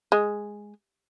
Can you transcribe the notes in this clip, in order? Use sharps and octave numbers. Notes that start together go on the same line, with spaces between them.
G#3